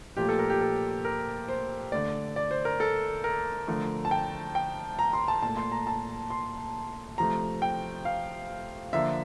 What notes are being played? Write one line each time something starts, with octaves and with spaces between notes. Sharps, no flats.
A#2 F3 A3 G4
A4
A#4
G4
A4
A#4
C5
D3 A3 D5
D5
C5
A#4
A4
A#4
D3 F3 A3
A5
G5
G5
A#5
C6
A5
A#2 A3 A5
C6
A#5
A5
C6
C3 F3 A3 A#5
G5
F5
D3 F3 A#3 E5